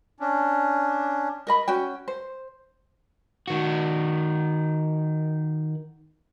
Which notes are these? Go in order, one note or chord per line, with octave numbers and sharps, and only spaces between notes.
C#4 D4
A#4 D#5 B5
C#4 F#4 G5
C5
D#3 F#4